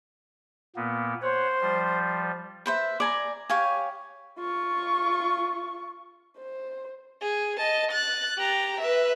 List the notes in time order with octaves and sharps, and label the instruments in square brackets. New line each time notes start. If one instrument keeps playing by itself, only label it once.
[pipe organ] A#2 A#3 B3
[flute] C5 [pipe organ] C#5 F#5
[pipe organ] F3 G3
[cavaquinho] B4 C5 E5
D5 G#5 A#5
G4 C#5 F5 G#5
[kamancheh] F4 C#6
C5
[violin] G#4
D#5 A5
F#6 A6
G4 A#5
B4 E5